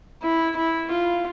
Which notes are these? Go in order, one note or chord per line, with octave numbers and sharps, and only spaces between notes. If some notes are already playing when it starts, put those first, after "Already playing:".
E4
E4
F4